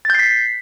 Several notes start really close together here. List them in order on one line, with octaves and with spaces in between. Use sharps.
A6 G6 C7 B6